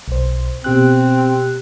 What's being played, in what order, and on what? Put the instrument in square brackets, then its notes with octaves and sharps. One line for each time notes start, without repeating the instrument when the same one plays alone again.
[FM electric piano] B1 C5
[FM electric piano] B2 G4 F#6 [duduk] C4